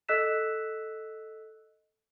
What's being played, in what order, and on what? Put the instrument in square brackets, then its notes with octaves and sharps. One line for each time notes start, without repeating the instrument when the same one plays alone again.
[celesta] A4 D#5 E6 F#6 B6 E7